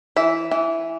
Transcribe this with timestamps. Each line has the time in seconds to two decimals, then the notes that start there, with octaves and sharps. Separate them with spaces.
0.16 E3 E5
0.51 E3